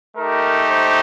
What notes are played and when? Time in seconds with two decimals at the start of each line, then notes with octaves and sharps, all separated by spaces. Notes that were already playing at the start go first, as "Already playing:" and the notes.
0.17 A3 D#4 G4 A#4
0.70 C5